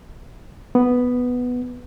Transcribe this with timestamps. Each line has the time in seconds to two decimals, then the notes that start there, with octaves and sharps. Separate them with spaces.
0.75 B3